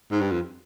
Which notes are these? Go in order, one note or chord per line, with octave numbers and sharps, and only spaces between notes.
G#2
G2
F2